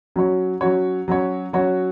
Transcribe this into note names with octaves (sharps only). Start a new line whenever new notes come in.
F#3 C#4 F#4 C#5
F#3 C#4 F#4 C#5
F#3 C#4 F#4 C#5
F#3 C#4 F#4 C#5